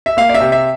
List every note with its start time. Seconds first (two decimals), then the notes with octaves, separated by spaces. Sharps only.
0.06 E5
0.17 A#3 F5
0.29 D5
0.34 E5
0.41 C3
0.52 E5